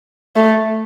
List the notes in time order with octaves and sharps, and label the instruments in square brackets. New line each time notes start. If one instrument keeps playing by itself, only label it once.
[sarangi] A3